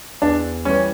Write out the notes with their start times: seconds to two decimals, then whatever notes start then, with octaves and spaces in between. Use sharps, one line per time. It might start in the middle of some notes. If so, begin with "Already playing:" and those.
0.22 E2 D4
0.65 E3 G3 C#4